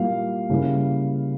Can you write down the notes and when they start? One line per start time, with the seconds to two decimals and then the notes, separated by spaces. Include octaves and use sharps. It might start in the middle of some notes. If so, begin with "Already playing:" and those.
Already playing: A#2 G3 A#3 E4 F5
0.50 C#3 G3 A#3 E4